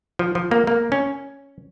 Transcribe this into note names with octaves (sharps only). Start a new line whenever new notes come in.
F3
F3
A#3
A#3
C#4